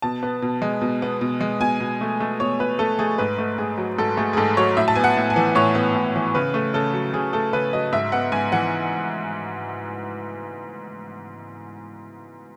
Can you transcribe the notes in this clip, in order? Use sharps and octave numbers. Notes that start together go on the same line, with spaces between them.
B2 A5
B3
B2
G#3
B2
B3
B2
G#3
B2 G#5
B2
A3
A3
B2 C#5
B2 B4
A3 A4
A3 G#4
G#2 B4
A3
G#2 G#4
F#3
G#2 A4
A3 G#4
G#4
G#2 A4
F#3 C#5
A2 E5
A5
B3 G#5
F#5
A2
G#5
E3
A2 C#5
B3
A2
E3
C#3 B4
A3
C#3 A4
F#3
C#3 G#4
A3 A4
C#3 B4
F#3 D#5
G#2 E5
B3 F#5
G#2 G#5
E3 F#5